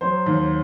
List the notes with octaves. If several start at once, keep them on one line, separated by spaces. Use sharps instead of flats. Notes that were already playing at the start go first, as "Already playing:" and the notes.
F#3 C5
D#2